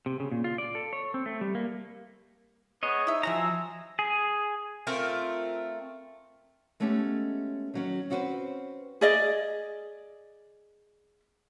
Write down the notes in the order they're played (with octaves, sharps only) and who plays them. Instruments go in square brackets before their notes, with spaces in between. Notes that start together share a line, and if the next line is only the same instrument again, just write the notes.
[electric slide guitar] C3
C#3
A#2
F4
D5
A4
C#5
C4
A3
G3
A#3
[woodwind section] B3 [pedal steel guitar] G#4 C#5 D#5
[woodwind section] D#4 D#6 [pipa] E4 E5
[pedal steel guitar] F3 A#5 [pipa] G3 F#4 E5 [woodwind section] G#5 E6
[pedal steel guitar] G#4
[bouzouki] A3 C4 F4 A#4
[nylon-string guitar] G#3 A3 B3 C#4 G4 A4
D#3 F#3 C#4
C4 C#4 F#4 G4 B4 C5
[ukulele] G#4 D5 D#5